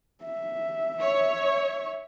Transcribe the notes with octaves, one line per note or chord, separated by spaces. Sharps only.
E5
C#5